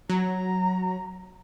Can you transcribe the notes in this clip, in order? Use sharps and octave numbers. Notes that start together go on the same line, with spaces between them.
F#3 A#5